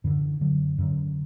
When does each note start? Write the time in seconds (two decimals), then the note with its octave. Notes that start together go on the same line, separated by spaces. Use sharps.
0.04 F#2 D3 E3
0.41 D3 F#3
0.78 F#2 D3